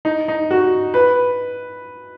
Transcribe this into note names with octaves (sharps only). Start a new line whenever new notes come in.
D#4
D#4
F#4
B4